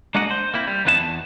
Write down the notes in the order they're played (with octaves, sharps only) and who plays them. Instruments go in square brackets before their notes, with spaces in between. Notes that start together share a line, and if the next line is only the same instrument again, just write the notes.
[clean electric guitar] G#3 A#3 D4 F#4 D#5 F#5
C5
A#3 C4 E4
G3
F2 D#3 B3 E4 G#4 A5
E2